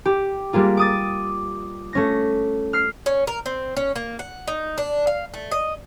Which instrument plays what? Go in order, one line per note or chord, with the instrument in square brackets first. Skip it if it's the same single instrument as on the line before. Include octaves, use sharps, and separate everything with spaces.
[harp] G4
G3 G#3 A#3 F4
D6 D#6 A6
A3 C#4 A#6
F6 C7
[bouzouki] C#4
A#4
C4
C#4
A#3
F#5
D#4
D4
F5
A3
D#5